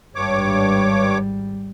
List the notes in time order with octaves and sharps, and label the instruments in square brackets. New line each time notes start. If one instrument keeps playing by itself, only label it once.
[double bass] G#1 G3 [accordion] G2 C#5 D6